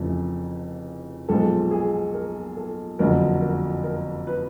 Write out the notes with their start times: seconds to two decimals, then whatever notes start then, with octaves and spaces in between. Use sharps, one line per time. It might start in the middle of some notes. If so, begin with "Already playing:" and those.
Already playing: F1 F2 C#3 E3 A3
1.28 B1 A#2 F3 G#3 A4
1.71 G#4
2.14 A#4
2.57 A4
2.99 F#1 F2 D3 F#3 A#4
3.41 A#4
3.84 A#4
4.27 B4